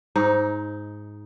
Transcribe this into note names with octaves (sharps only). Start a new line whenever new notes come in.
G#2 D#4